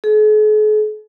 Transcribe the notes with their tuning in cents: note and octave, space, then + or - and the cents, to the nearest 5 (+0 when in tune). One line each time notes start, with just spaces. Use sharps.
G#4 +45